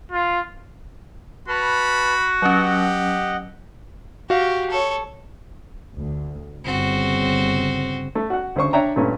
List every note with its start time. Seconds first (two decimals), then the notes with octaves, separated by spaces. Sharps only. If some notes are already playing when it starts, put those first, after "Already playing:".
0.11 F4
1.48 F#4 B4 A5 B5 F6
2.42 F#3 C#4 G4 D#5 F#5
4.30 F#4 G4 F5
4.70 A4 C#5
5.97 D2
6.64 G1 C#3 C4 F#4
8.15 A3
8.30 F#4 F#5
8.56 D2 C#3 C5 C#6
8.73 D4 C#5 D5 E5 G5 A#5
8.96 G2 A#2 A3 B3 C#4